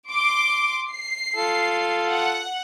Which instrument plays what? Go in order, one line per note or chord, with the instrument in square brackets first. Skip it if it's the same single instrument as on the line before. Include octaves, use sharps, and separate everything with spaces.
[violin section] C6 D6
C7
[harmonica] F4 A4
[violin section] F#5